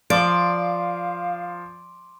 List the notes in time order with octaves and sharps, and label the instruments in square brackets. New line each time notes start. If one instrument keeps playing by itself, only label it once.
[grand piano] F3 [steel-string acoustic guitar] D5 [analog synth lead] F5 [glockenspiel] C6 D6 D7